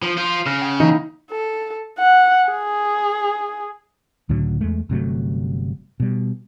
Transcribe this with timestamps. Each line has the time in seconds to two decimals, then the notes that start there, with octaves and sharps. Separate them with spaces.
0.02 F3
0.17 F4 C5
0.46 C#3 F6 F#6 A#6
0.61 G5
0.80 E3 A#3 D#4 E4
1.31 A4
1.99 F#5
2.49 G#4
4.29 C#2 A2 D3 F#3
4.61 E2 G#3 A3
4.90 G1 C3 F#3 A3
6.00 B2 G3